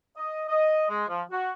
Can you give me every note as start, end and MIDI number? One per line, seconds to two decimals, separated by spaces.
0.16 0.43 75
0.48 0.87 75
0.89 1.05 56
1.08 1.22 53
1.31 1.52 66